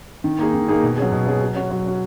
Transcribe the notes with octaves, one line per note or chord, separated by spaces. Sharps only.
D#3
A#3 D#4 G#4
D#3
A#3 D#4 G#4
B2
F#3 C#4 G#4
B2
F#3 C#4 G#4
F#3
C#4 F#4
F#3
C#4 F#4